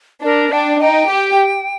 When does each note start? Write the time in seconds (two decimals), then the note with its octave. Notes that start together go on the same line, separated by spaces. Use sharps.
0.23 D4 A#4
0.52 D4 G5
0.81 D#4 G5
1.09 G4